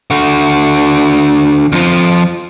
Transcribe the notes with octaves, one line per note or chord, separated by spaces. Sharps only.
D3 F#4
F2 F3